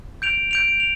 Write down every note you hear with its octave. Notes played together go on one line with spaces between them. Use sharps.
G6 D7 F7
G6 D7 F7
F7